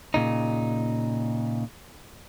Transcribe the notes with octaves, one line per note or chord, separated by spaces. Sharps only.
A#2 C#3 D#4